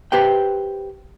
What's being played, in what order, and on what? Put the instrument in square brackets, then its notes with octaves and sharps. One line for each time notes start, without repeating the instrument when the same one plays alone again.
[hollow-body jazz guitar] G4 B4 C5 G5